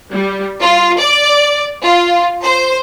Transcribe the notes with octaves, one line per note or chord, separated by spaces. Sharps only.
G3
F4
D5
F4
C5